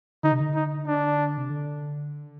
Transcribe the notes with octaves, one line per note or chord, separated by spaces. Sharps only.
D3 D#4
C3
D3
D#4
D4
C3
D3